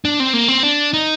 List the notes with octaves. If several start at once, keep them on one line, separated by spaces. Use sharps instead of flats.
D4
C4
A#3
C4
D4
D#4